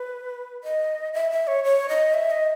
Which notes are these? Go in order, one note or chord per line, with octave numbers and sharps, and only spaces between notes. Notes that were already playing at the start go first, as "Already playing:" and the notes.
Already playing: B4
D#5
E5
E5
C#5
C#5
D#5
E5
D#5